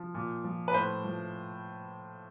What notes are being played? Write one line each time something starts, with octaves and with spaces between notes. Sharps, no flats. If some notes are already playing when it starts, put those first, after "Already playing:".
Already playing: F3
A#2
F3
B4
A2 C5
F3